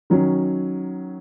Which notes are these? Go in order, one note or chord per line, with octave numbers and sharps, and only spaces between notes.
D#3 F#3 C#4